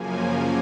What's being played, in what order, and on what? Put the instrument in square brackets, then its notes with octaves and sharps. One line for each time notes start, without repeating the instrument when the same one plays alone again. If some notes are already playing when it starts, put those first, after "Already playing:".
Already playing: [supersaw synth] F#2 C#3 F3 A#3 G#5